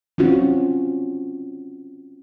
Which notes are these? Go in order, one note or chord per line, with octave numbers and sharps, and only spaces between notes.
C4 C#4 F4 F#4